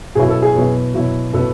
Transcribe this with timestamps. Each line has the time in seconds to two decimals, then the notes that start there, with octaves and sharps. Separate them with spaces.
0.15 B2 F#3 B3 E4 G#4
0.29 A4
0.42 G#4
0.55 B2 F#3 B3 E4
0.94 B2 F#3 B3 E4
1.33 B2 F#3 B3 E4 A4